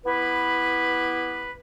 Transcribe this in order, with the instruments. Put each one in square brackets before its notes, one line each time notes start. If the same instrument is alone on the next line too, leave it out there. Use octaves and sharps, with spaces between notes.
[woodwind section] B3 E4 G4 B4